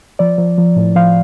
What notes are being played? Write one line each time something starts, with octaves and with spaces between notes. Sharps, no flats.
F3 D5
F3
F3
A2
F3 F5